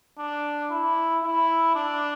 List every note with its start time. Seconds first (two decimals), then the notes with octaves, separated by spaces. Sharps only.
0.18 D4
0.70 E4
1.23 E4
1.75 D4